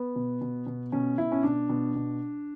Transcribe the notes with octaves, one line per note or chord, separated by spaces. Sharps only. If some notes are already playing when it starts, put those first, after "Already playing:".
Already playing: B3
B2
B2
B2
B2 C#4
B2 E4
C#4
B2 D4
B2
B2